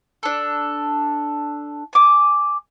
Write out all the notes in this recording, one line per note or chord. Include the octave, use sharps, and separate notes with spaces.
D4 A4
G#5 D6